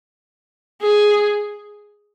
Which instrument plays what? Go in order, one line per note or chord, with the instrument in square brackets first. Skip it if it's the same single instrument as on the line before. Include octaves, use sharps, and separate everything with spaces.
[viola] G#4